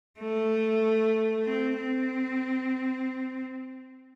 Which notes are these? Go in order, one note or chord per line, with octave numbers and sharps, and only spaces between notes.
A3
C4
C4